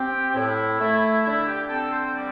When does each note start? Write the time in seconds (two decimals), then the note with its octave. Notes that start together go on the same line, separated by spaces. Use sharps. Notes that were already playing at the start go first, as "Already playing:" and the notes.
Already playing: C4 G4
0.30 G4
0.35 A2 E4
0.80 A3 E4
1.25 D3 E4
1.47 G4
1.65 G4
1.69 C4 A4
1.92 C5
2.14 G3 D5